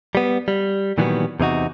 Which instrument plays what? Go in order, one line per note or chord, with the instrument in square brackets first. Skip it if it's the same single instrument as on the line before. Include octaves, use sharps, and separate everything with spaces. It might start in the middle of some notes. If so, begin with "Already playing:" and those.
[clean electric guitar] G3 B3
G3
A#2 D#3 E3 F#3 G3 B3
E2 C3 D#4 F#4